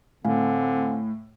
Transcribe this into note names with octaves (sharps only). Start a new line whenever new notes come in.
A2 D3 C4 F5 G#5